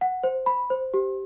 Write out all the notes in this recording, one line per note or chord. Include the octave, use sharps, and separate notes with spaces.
F#5
C5
B5
C5
G4